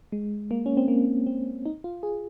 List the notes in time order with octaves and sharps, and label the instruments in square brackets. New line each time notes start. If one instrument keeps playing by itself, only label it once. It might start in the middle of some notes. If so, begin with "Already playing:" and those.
[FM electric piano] G#3
A#3
C#4
C4
A#3
C4
D#4
F4
G#4